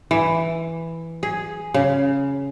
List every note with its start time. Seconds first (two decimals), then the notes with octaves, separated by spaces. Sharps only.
0.11 E3
1.23 G#4
1.74 C#3